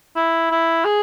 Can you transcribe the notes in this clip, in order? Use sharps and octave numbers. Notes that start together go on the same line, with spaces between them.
E4
E4
G#4